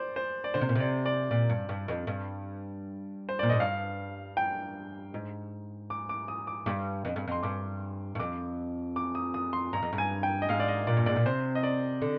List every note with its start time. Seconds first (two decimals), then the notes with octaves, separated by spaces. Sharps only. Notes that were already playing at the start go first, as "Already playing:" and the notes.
Already playing: C5 D5
0.16 C5
0.44 D5
0.54 D3 C5
0.61 C3
0.69 A#2
0.75 C3 D5
1.06 D5
1.31 A#2 D5
1.50 G2
1.69 G2
1.88 F2
2.07 G2
3.29 C5
3.39 A#2 D5
3.49 G#2 D#5
3.60 G2 F5
4.37 G5
5.14 G#2
5.90 D6
6.09 D6
6.28 D#6
6.47 D6
6.66 G2 D6
7.05 F2
7.16 G2
7.27 F2 C6
7.43 G2 D6
8.15 G2
8.19 F2 D6
8.96 D6
9.15 D#6
9.34 D#6
9.53 C6
9.73 G2 A#5
9.83 F2
9.93 G2
9.98 G#5
10.23 G5
10.42 D#5
10.49 G#2 F5
10.60 D5
10.68 D#5
10.87 A#2 D5
10.97 G2
11.06 G#2 D5
11.16 A#2
11.26 C3 C5
11.55 D#5
11.63 D5
12.02 D3